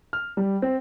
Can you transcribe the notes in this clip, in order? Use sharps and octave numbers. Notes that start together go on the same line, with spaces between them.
F6
G3
C4